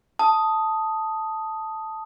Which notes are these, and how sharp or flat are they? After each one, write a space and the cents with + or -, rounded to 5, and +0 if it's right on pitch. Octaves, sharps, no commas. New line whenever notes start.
A5 +0 D#6 +5